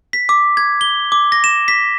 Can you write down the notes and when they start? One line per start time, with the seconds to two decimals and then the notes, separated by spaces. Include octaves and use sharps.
0.13 B6
0.29 D6
0.57 G#6
0.81 G7
1.12 D6
1.32 A#6
1.44 E7
1.68 B6